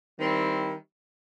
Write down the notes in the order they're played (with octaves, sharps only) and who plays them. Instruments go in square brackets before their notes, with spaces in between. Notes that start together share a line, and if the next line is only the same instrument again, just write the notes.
[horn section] D#3 G3 C4 E4